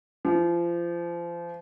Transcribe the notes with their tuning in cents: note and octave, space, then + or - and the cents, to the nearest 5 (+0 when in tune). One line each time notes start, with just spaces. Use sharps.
F3 -30